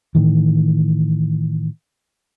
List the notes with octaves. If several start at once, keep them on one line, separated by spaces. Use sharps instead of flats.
A2 D#3 E3